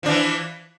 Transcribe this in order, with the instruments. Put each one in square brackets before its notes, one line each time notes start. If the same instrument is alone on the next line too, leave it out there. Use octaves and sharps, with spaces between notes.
[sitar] F3
D4
E3